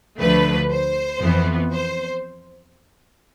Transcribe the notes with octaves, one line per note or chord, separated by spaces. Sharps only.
D2 D3 F3 A3 B4
C5
F2 E3 B3
C5